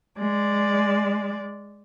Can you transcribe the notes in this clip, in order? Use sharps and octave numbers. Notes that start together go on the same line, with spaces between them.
G#3 D5